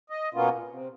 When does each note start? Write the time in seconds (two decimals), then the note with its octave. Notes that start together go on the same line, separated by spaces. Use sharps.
0.10 D#5
0.34 B2 A#3 B3 C#4 F4
0.52 A#2
0.69 C3